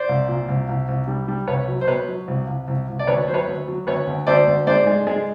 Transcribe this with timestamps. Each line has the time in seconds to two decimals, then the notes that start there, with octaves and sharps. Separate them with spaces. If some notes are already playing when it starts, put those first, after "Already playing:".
Already playing: C5 D5
0.09 C2
0.28 A#2
0.48 C2
0.68 C2
0.88 C2
1.08 G3
1.28 G3
1.47 C2 B4 C#5
1.68 F#3
1.81 C5
1.88 B2 B4 C#5
2.07 F#3
2.28 C2
2.47 C2
2.68 C2
2.88 C2
2.99 D5
3.07 D2 B4 C#5
3.28 F#3 C5
3.34 B4 C#5
3.47 D2
3.67 F#3
3.87 D2 B4 C#5
4.07 D2
4.27 D2 C5 D5
4.47 D2
4.67 G#2 C5 D5
4.87 G#3
5.07 G#3